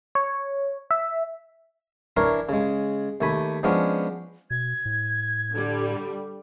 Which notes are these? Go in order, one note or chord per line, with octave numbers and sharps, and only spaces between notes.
C#5
E5
E3 D4 A#4 C#5 C6
C#3 G#3
D#2 A3 G#5 B5
F3 G#3 B3 C#4 D4 F4
B2 G#6
A2
D3 G3